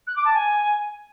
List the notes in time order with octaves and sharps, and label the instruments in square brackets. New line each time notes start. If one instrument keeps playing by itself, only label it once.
[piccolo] F#6
D6
A5
G#5